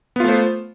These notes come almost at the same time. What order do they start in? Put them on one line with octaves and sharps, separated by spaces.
B3 F4 A3 C5